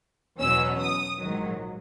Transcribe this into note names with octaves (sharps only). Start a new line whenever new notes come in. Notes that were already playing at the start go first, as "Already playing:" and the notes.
E2 B2 F#3 C#4 E6
D#6
A#1 G#2 D#3 F#3